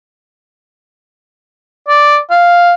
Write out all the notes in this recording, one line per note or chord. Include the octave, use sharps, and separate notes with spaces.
D5
F5